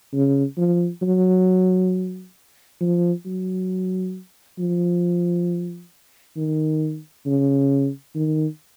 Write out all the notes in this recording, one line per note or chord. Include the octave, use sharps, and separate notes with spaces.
C#3
F3
F#3
F3
F#3
F3
D#3
C#3
D#3